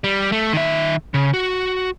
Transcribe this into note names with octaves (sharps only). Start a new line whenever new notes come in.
G3
A3
D#3 E5
C#3
F#4